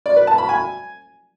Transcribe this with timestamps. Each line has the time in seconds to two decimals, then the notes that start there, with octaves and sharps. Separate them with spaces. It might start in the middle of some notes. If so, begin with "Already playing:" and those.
0.06 D5
0.16 B4
0.27 A5
0.38 B5
0.49 G#5